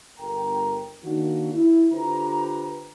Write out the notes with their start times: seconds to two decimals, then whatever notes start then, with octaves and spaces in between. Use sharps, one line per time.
0.18 G1 A#4 G5 A#5
1.03 D#3 A#3 D4 F#4
1.53 E4
1.92 D3 F4 G4 B4 C5 A#5